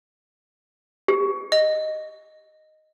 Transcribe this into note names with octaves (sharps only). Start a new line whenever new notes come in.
G4
D#5